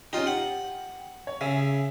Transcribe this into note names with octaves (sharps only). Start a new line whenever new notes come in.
C#4 D#4 F4 G4
G4 F#5
C#5
C#3 G#4 E5